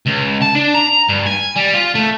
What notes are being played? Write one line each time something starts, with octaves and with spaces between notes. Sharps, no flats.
C#2
A5
D4
A#5
G2
G#5
G3
F4
A3